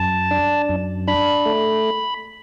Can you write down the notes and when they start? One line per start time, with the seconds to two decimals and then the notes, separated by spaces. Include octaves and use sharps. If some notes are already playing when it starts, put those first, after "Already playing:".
Already playing: F#2 A5
0.31 D4
0.69 F#2
1.08 D4 B5
1.45 A3